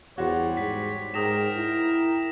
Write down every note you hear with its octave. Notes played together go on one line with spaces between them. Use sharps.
E2 G3 F#4 C5 C#5
G#2 B6
G#2 A#4 G5 D#6 A#6 E7
E4